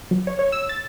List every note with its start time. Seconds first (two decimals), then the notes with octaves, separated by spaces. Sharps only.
0.11 F#3
0.27 C#5
0.39 C#5
0.52 E6
0.69 A6